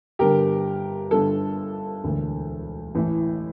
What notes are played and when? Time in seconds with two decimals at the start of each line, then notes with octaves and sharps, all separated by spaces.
0.19 G1 G2 D3 G4 A#4
1.11 G1 G2 D3 A4
2.04 E1 D2 D3
2.95 A1 A2 E3